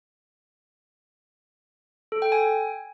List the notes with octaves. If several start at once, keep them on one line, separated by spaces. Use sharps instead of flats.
A4
G5
G#5